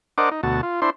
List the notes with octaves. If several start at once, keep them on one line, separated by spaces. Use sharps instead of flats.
D4 A#4 C5 D#5 F#5 D6
D#4
D2 B2 F#4 A5
F4
D4 E4 C5 C6